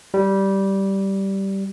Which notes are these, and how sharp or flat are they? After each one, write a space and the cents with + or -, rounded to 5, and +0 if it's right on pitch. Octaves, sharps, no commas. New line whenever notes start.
G3 -10